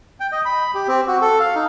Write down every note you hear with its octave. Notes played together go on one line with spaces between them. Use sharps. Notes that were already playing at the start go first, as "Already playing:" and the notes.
G5
D#5
B5
G4
C4
F#4
A4
F5
D#4